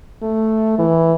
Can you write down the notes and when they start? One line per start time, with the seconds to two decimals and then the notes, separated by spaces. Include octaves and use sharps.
0.22 A3
0.79 E3